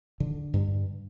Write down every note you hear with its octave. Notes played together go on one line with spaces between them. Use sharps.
D3
G2